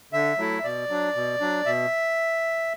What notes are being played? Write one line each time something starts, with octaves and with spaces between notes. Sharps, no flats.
D3 E5
F#3 A3 E4
B2 D5
F#3 D4
B2
F#3 D4
B2 E5